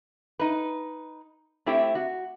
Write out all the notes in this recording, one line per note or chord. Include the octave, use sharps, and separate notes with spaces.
D#4 B4
A3 C4 E4 G4
F#4